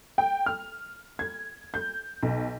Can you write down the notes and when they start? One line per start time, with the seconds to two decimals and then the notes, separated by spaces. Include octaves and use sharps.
0.18 G5
0.46 F6
1.19 G#6
1.74 G6
2.23 B1